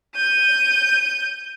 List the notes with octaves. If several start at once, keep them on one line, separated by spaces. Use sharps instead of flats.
G6 D#7